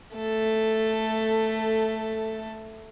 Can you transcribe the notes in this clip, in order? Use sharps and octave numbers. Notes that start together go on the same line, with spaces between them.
A3 A4